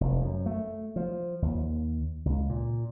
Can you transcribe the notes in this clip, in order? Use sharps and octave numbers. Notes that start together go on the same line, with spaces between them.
F1
F#2
A3
F3
D#2
C#2
A#2